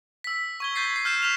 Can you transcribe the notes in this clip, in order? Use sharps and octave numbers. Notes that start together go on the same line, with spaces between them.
E6 B6
C#6 G#6 G7
G6 A6 B6 C7
G6 C7
F6 G6 C7 E7
F6 B6 E7 F7